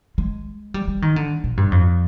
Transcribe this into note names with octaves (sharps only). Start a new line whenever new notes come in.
G#3
G3
G3
D#3
D3
A#2
G2
F2